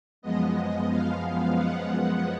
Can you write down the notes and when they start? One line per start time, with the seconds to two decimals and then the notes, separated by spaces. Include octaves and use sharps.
0.22 F#2 F3 G#3 B3 D#5
0.90 F5
1.24 F5
1.57 F#5